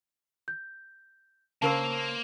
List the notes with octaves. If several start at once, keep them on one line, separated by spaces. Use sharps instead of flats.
G6
C#3 A#3 A#4 C5 A5 E6